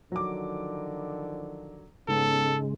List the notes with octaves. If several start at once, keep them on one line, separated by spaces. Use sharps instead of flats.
D3 D#3 F3 F#3 D6
G#2 C#3 G#3 B3 C#4 A4